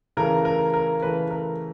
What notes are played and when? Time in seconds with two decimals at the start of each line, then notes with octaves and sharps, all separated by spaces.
0.17 C#3 E3 A3 A#4
0.45 A#4
0.74 A#4
1.02 C#3 E3 A3 B4
1.30 A#4